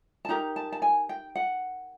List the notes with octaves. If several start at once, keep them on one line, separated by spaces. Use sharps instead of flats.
A5
D#4 G4 A#4 A#5
A5
A5
G#5
G5
F#5